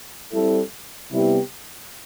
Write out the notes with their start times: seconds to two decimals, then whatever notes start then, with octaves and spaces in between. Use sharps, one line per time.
0.33 G3 C4 E4 A4
1.12 C3 G3 B3 E4 G4